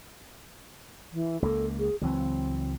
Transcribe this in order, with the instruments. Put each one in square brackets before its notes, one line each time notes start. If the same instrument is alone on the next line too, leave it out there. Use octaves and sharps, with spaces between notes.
[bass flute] E3
[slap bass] C#2 A#3 [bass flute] A4
[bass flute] G#4
[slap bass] C#2 E3 F#3 [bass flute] C4